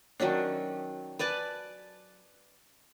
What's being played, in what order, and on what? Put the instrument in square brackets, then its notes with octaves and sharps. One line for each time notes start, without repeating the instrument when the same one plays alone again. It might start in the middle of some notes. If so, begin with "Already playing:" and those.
[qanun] D#3 F#3 C#4 D4
B4 D5 G#5 A5